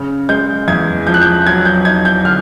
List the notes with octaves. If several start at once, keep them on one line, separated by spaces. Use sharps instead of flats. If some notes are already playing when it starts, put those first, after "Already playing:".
Already playing: C#3
G#3 G6
E2 G#6
F3 G6
F#6
G6
F#3 G#6
G6
D#4 G#6
G6
D3 F6